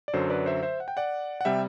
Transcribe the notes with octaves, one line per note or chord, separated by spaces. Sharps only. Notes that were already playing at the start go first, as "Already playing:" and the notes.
D5
F#2 D3 F#3 A4 C5
B4 D5
C5 E5
C5 E5
F#5
G5
D5 F#5
F#5
C3 G3 E5 G5